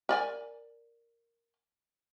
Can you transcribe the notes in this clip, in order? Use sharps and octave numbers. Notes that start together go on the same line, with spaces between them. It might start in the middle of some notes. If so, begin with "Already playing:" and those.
A#4 D5 G#5